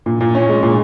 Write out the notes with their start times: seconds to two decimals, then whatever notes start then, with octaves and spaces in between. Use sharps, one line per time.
0.06 A#2
0.21 A#2
0.35 C#4
0.49 G#3
0.63 A#2